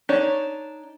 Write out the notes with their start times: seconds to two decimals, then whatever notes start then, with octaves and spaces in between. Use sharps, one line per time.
0.09 D4 D#4 C#5